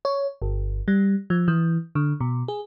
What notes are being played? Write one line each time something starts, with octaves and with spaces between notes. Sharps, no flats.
C#5
G1
G3
F3
E3
D3
B2
G#4